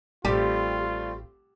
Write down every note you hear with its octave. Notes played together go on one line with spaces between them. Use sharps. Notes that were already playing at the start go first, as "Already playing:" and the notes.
A1 G3 A3 C4 F4 G4